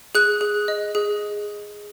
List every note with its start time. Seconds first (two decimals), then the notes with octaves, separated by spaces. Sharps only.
0.15 G#4 F#6
0.41 G#4
0.68 D#5
0.95 G#4